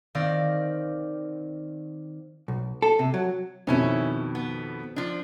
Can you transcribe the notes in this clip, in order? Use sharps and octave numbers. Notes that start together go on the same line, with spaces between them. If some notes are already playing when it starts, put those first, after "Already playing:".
D#3 C4 D5 F5 A#6
B1
A4
C3
F#3
F2 B2 D#3 G3 C#4 E4
B3
F3 D4